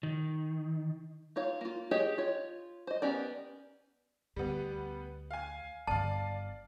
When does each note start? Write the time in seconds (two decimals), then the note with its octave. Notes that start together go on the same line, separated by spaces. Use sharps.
0.03 D#3
1.36 D#4 F4 C#5 F5
1.61 A#3 F4
1.91 G4 G#4 C#5 D#5
2.18 F4 C#5
2.87 C5 D#5
3.02 B3 C#4 G4 A#4 D5
4.36 D2 D3 G3 B3
5.31 F5 G#5
5.87 G1 D3 D5 F5 A5